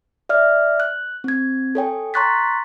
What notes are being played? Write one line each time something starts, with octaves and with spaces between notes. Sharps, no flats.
D5 E5 F6
F#6
C4 G#6
A4 C#5 G5 G#5
A#5 C6 C#6 F#6 A6 B6